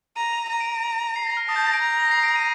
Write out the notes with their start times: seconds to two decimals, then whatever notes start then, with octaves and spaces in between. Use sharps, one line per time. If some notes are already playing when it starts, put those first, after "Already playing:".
0.16 A#5 D#7
0.33 F7
0.49 A#5 D#7
0.60 D7
0.72 D7
1.16 C7
1.27 A#6
1.37 F6
1.48 A5 D#6
1.56 G6
1.64 A#6
1.73 D7
1.81 A#5
1.99 A#6
2.11 C7
2.23 D7
2.36 D#7